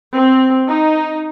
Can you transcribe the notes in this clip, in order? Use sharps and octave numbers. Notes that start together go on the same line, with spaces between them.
C4
D#4